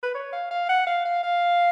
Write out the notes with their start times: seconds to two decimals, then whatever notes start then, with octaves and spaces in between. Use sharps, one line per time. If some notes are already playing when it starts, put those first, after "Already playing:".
0.03 B4
0.14 C#5
0.33 F5
0.51 F5
0.69 F#5
0.87 F5
1.05 F5
1.23 F5